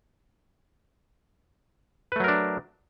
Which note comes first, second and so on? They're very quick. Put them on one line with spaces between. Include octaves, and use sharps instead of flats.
B4 A3 F#3 A#4 D4